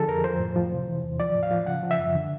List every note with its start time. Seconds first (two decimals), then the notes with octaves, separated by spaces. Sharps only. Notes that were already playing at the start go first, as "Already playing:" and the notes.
Already playing: D3 F3 G#4 A4
0.08 F2 A#4
0.24 F3 C5
0.39 A2
0.56 F3
0.72 C3
0.88 E3
1.03 E2
1.20 F3 D5
1.35 A2
1.43 F5
1.51 F3
1.66 C#3 F#5
1.83 F3
1.91 E5
1.99 F#2
2.15 D3